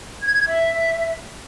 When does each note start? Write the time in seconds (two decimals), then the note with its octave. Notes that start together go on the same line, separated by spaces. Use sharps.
0.21 G#6
0.47 E5